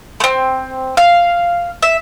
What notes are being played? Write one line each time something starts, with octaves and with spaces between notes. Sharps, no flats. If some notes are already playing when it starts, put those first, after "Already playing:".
A3 C4
F5
E5